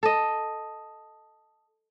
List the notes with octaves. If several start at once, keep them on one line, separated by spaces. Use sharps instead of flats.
A4 D#5